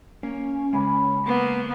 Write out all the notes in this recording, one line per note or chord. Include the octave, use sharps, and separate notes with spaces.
A#3 C#4
C#3 G#3 G#5 B5 D6
A#3 B3 C6